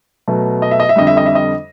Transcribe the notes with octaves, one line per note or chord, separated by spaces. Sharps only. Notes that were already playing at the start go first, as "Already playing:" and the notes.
B2 F#3 A3
D#5
E5
D#5
E5
F2 D3 G3 D#5
E5
D#5
E5
D#5